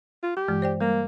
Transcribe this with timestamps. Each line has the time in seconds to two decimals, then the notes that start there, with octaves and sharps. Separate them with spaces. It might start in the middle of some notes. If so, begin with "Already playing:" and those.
0.23 F4
0.37 G4
0.48 G2 E3 G#3
0.62 C5 D5 G5
0.81 G3 A#3